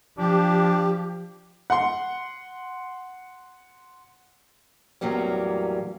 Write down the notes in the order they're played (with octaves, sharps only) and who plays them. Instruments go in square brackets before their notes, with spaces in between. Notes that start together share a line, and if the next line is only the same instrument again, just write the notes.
[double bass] F3 [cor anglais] D4 [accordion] G4
[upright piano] F#5 C6
[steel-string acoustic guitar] E2 A2 F#3 G3 A#3 C#4